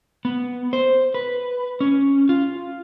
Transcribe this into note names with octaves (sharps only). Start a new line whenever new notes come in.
B3
C5
B4
C#4
F4